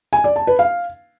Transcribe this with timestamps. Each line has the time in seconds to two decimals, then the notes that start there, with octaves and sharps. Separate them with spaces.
0.13 G#5
0.24 D5
0.36 A5
0.47 B4
0.59 F5